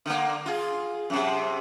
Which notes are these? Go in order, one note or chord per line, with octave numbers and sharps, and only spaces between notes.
D3 A#3
F4 G#4
F#2 C3